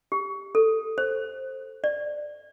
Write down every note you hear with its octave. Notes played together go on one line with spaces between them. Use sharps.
G4
A4
C5
D5